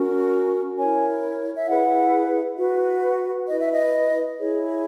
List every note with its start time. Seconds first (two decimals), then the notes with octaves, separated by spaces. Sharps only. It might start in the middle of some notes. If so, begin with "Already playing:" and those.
Already playing: C#4 F#4 A#4
0.78 E4 A#4 C#5 G#5
1.56 E5
1.67 E4 G#4 B4 F#5
2.58 F#4 B4
3.47 E4 B4 D#5
3.60 E5
3.72 D#5
4.38 E4 G#4 C#5